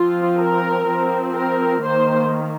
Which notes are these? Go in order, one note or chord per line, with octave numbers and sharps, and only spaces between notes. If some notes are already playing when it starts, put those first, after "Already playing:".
Already playing: F3 C4 F4
A#4
F3 C4
A#4
D#3 A#3 C5